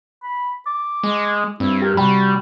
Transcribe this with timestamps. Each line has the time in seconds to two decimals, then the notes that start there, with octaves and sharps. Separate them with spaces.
0.23 B5
0.67 D6
1.03 G#3
1.60 G2 C4 E4
1.82 G4 A#4
1.97 C3 G3 F#4 G5 B5